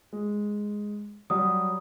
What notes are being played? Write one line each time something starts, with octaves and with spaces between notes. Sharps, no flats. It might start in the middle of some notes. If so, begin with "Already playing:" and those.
G#3
F#3 G3 D#6